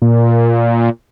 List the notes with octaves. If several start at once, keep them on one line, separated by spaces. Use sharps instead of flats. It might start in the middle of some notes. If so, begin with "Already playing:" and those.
A#2